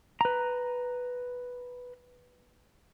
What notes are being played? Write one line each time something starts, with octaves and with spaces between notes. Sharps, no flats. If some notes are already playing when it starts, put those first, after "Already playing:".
B4 A#5